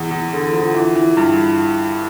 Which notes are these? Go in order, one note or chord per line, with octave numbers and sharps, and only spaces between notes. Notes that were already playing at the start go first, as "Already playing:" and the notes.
Already playing: E2
E2
D3
F3
E3
E3
G2